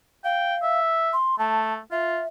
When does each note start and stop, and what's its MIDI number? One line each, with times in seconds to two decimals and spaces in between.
0.24 0.79 77
0.24 0.56 79
0.63 1.13 76
1.13 1.38 84
1.39 1.79 57
1.39 1.73 81
1.92 2.22 65
1.92 2.28 76